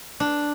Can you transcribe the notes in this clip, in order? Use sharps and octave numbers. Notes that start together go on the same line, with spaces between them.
D4